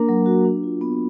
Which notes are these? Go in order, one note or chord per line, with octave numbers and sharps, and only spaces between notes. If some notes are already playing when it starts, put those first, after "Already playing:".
Already playing: A#3 D4 A#4 A#5
F#3
F#4
D4
F4
B3